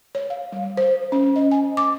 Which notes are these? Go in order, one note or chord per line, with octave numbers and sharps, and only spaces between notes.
C#5
F5
G3
C5
C#4
D#5
G#5
D6